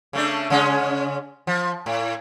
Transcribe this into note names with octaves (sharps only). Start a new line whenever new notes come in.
C#3 A3 D4
C#3 G#3 C#4
F3
A2